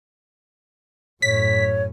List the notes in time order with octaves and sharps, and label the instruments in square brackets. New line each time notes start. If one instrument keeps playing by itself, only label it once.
[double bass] F#2 A2 [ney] C#5 [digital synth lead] B6